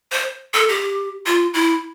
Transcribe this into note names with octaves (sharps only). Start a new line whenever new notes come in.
C5
A4
G4
F4
E4